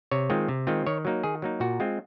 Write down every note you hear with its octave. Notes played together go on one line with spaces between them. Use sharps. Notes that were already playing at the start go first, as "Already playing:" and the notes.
C3 C#5
D#3 G#3 C4 F4
C3
D#3 G#3 C4 F4
D#3 C#5
F#3 A#3 D#4
D#3 G#4
F#3 A#3 D#4
A#2 F#4
G#3 C4 F4